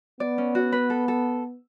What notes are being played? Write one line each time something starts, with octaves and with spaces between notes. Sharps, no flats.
B3 D5
C#4
F#4
B4
A4
A4